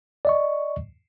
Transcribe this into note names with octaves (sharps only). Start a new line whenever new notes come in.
D5 D#5 C#6